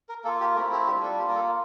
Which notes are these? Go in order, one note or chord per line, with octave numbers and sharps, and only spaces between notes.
A#4
A#3 F4 A4
G4
A3 C4 E4 A#4
G4
G3 D4 F4 G4
A4
A#3 F4 G4
A#4
A4